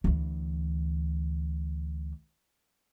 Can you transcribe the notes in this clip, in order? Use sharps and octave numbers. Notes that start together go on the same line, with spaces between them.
D2 E3